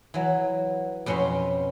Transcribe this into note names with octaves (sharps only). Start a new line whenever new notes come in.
E3 F#3
F2 B2 C#4 B5 C6